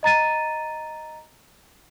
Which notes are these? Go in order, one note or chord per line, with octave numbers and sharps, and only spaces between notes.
D#5 A#5 A6 D#7